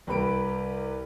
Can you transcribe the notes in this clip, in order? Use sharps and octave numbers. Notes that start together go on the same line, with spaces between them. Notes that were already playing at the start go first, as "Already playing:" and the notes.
C2 G4 B4 B5 D7